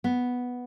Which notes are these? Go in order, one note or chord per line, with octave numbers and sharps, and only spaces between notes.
B3